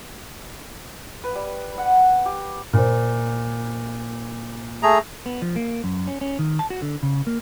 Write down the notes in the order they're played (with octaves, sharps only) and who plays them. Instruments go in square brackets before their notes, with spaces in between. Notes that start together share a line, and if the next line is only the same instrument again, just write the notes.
[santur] B4
G3
F#5
G4
[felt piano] A#2 A#3 C5
[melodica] A3 G#4 A#5
[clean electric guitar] B3
F3
A#3
F#2
C#4
C#4
D#3
A5
F#4
D3
C#3
A#3